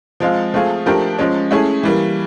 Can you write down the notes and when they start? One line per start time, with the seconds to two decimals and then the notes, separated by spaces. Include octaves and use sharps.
0.20 F3 G#3 C4 F4
0.54 F3 A3 C4 F4 G#4
0.86 F3 A3 D4 G4 A#4
1.19 F3 G#3 C#4
1.51 A3 C#4 E4 G#4
1.83 E3 G3 A#3